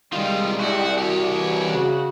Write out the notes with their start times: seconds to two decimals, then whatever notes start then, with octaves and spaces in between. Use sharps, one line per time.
0.13 C3 D#3 G3 G#3 F4
0.60 C2 F#4 G4 D5
0.98 F#4 G4 C#5
1.30 E3
1.69 C#3 F#4 F#5